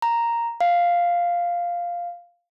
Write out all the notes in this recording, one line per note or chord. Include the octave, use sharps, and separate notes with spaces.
A#5
F5